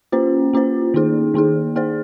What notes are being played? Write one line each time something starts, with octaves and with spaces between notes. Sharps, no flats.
A#3 C#4 F4 C5
A#3 C#4 F4 C5
D#3 A#3 D#4 G#4
D#3 A#3 D#4 G#4
A#3 D#4 G#4 C5